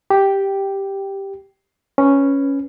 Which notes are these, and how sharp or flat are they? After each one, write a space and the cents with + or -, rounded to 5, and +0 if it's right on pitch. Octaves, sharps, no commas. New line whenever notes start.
G4 +0 G5 -5
C#4 +0 B4 +5